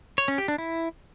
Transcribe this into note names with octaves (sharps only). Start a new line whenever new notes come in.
C#5
C#4
G4
D4
E4